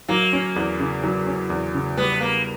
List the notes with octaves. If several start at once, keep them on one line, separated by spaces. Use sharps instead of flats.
F#3 A#3
C#4
E2
C#3
F#3
C#4
E2
C#3
G3 B3
A#3 B3